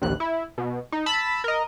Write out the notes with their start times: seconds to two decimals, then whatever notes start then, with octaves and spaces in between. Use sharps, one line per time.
0.02 A#1 D#2 F#6
0.20 E4
0.58 B2
0.92 D#4
1.06 A5 B5 E6
1.44 A#4 D#5